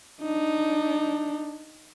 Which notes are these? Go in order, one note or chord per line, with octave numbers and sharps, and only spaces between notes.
D4 D#4